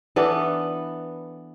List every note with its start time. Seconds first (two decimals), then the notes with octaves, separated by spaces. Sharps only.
0.16 E3 B3 D4 A4